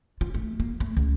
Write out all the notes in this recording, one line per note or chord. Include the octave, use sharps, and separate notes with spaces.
F4
A3
A#3
A3
C#2